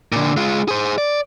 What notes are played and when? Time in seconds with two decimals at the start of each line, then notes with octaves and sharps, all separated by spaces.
0.12 A#2 D3
0.37 G#3 F4
0.68 G#4 C5
0.98 D5